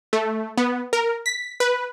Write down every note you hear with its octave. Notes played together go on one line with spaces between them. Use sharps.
A3
B3
A#4
B6
B4